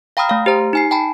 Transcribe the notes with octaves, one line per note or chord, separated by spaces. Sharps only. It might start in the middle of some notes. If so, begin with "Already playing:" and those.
F5 G5 A#5 B5 D#6 F6
A3 F5
G4 C5 A#5
D#4 G#5 C7
G5 A5 B5